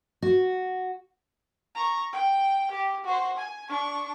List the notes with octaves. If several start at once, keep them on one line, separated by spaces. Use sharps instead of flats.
F#4
A#5 C#6
G5
G4
F#4 C5
G#5
D4 C#6